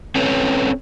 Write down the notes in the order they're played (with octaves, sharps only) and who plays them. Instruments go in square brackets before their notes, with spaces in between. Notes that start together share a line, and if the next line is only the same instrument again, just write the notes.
[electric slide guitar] C4 C#4 A4 B4 C#5